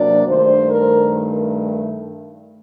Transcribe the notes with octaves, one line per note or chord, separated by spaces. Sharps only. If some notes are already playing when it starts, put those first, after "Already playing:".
Already playing: C3 F#3 A#3 D4 D5
G2 D#3 A3 C5
A#4